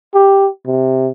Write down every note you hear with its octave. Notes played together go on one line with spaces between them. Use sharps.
G4
C3